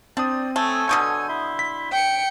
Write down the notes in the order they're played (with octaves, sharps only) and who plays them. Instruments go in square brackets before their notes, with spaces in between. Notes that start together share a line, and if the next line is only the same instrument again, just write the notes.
[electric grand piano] C4 D#6 [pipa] D4 [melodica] C5 D5
[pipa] A3 [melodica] A4 C#5 G#5
[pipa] B2 D3 C#6 [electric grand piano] D#6 G6
[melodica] E4 E5 C6
[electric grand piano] B6
[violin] G5 C#7